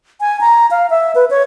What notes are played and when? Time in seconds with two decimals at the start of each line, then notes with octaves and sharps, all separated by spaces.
0.21 G#5
0.41 A#5
0.71 F5
0.90 E5
1.15 B4
1.31 C#5